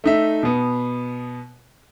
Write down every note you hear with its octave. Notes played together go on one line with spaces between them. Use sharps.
A3 D#4 E5
B2 B3